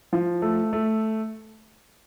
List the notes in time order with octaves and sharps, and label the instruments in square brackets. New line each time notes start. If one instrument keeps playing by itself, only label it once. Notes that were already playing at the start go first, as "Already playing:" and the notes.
[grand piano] F3
A3
A3